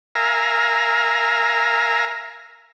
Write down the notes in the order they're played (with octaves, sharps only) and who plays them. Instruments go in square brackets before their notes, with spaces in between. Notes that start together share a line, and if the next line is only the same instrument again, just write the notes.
[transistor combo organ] A#4 E5 F5 G#5 A#5